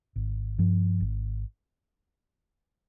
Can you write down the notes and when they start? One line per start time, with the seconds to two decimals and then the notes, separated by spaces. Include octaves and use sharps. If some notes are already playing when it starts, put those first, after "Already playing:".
0.16 G#1
0.58 G2 F3
1.01 G#1